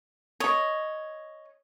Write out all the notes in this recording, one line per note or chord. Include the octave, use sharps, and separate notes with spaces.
C#5 D#5